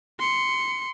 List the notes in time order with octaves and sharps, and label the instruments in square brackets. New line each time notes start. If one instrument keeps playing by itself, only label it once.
[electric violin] C6 C#7